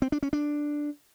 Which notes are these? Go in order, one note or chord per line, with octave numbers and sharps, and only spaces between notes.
C4
D4
C#4
D4